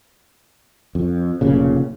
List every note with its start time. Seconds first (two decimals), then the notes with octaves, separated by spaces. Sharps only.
0.95 F2
1.41 F1 A#2 C#3